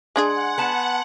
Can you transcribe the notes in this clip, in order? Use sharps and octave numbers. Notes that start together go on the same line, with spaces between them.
G#3 D4 G#4 F#5 G#5 C6 G#6
B3 A5